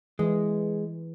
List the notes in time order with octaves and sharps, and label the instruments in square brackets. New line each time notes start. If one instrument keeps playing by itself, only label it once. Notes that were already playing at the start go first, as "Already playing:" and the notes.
[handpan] E3 E4 [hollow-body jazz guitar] G#3